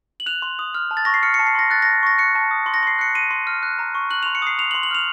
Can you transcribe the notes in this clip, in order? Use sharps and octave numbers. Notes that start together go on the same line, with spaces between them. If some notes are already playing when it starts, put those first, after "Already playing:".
F#7
F#6 F7
C6
D#6
F6
A5
A6
C#6 A#6
C7
F6 C#7
C#7
A5
C7
C6 A#6
F#6 A6
A5 A#6
C#6 A#6
F#6 C#7
A5
D#6
C6
A#6
C6 C7
F#6 C#7
C6 D#7
C6
F6
F#6
A#5
C#6
F#6 F#7
C6 F7
C#7
D#6 C7
C6 F7
F#7
C6
F#7
F6 F7